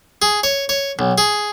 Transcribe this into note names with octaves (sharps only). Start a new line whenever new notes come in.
G#4
C#5
C#5
B1
G#4